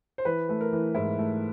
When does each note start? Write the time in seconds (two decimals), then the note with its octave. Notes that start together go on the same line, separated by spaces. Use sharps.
0.18 C5
0.25 E3 B4
0.49 A3 B4
0.61 A#4
0.73 E3
0.95 G#2 E4
1.19 A3